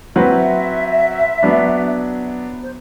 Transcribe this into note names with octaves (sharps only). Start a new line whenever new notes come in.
F#3 C4 F#4 B4 E5
F#3 B3 D4
C5